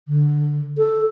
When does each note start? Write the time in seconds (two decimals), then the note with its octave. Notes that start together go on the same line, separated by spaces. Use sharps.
0.08 D3
0.78 A4